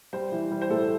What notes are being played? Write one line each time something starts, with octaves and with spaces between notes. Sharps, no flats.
G3 C5
E3
G3
C5
A2 A4